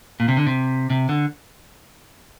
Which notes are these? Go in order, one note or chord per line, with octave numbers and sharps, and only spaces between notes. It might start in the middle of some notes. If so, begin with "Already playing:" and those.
A#2
C3
D3
C3
C3
D3